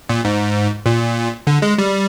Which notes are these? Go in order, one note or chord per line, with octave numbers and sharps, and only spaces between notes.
A#2
G#2
A#2
D3
G#3
G3